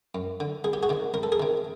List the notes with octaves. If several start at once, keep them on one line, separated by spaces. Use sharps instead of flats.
F#2
D3
C2 G#4
G4
F#4 G#4
C3 D#3
C2 A#4
A4
G#4 A#4
C3 D#3